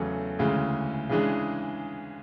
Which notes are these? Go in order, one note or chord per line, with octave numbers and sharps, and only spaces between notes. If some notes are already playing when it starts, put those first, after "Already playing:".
Already playing: E2 C#3 F#3 A3 C#4
D2 C#3 E3 G#3
C#3 E3 G#3 D4 G#4